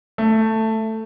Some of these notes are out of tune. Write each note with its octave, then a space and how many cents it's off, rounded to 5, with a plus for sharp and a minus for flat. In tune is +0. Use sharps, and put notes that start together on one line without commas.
A3 +10